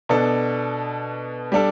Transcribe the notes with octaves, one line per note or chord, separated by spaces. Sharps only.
B2 B3 D4 A4
G3 D4 A4